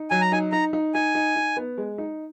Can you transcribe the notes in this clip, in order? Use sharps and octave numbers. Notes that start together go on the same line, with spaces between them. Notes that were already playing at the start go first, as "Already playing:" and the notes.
Already playing: D#4
F#3 G#5
A#5
D#4 G#5
D#4 A#5
D#4
D#4 G#5
D#4
D#4
B3
G#3
D#4